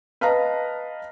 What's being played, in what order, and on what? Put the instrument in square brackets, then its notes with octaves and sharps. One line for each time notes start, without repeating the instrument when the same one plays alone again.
[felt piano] B4 D#5 F5 A5 A#5